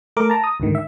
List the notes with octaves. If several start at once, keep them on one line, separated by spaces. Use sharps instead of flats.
A3 A#4 D6
A5 A#5
D#6
D2 G#2 D3 D#3
E5